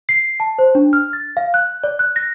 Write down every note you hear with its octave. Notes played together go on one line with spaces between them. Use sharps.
C7
A5
C5
D4
F6
A6
F5
F#6
D5
F#6
A#6